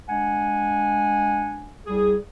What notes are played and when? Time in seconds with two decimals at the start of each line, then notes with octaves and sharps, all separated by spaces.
0.08 G#3 D4 F#5 G#5
1.87 C2 G3 G#4